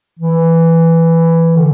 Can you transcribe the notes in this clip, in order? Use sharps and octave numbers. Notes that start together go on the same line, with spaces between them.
E3
D3